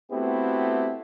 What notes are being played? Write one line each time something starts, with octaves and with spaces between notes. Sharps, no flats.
A3 B3 C4 E4 F#4 G4